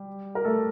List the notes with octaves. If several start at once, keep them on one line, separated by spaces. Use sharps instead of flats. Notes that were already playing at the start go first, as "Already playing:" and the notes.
Already playing: G3 G4
A#4
A3 A4